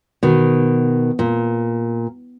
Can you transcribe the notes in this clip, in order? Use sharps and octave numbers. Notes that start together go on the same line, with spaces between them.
B2 D#3
A#2